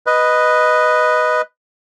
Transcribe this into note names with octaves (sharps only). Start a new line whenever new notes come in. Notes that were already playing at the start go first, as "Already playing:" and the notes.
B4 D#5